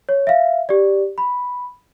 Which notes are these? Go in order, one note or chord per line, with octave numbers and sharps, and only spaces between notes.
C#5
E5 F5
G4 D5
B5